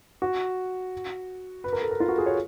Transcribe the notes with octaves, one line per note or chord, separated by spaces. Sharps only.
F#4
B4
A#4
A4
A#4
F4
F#4
G#4
C#5